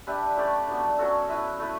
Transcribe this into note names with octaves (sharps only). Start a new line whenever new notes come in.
D4 G4 B4 E5
A3 C#4 G4 D5
F#3 B3 D4
F#3 C#4 F#4 A4
E4 B4 E5
A3 E4 B4